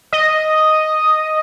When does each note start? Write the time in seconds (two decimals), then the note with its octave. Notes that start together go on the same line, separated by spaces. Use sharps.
0.13 D#5